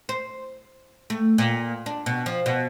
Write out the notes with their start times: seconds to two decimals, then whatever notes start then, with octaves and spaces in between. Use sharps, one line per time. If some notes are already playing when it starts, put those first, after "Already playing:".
0.09 C5
1.10 A3
1.38 A#2
1.86 D4
2.06 B2
2.26 F3
2.46 B2